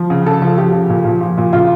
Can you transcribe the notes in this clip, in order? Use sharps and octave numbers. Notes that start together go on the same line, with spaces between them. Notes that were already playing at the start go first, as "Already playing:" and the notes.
Already playing: F3
C#3
C#3 A4
F3
F3 G4
C#3
A#2
F3
F3
A#2
C#3 F4